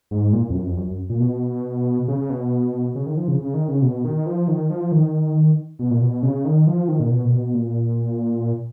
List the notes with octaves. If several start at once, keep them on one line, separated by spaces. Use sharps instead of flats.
G#2
A#2
F2
F#2
F2
F#2
F#2
A#2
B2
C#3
C#3
B2
C#3
D#3
F3
C#3
C#3
D#3
C#3
B2
D#3
F3
D#3
F3
D#3
B2
A#2
B2
C#3
D#3
F3
D#3
A#2
B2
A#2
B2
A#2